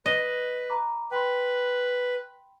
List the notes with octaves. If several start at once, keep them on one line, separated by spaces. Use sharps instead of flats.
B4 D#5
A#5 B5 D6
B4 G5 B5 C6